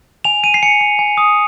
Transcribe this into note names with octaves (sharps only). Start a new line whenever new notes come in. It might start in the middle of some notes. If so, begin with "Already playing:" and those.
G#5 F7
G#5 D#7
C7
G#5 C#7
G#5
G#5
D#6